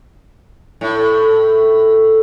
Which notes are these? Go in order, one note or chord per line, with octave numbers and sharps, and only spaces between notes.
A2